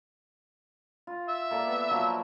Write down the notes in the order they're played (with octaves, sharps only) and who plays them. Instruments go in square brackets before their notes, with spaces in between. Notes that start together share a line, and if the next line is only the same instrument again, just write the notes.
[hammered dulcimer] F4
[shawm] E5
[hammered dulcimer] A#3 A4 D5
B3 B4
F3 F#3 A#3